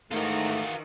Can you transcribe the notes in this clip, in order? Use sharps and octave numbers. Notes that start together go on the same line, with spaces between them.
G#2 D#3 E3 A3 D#4 F4 F#4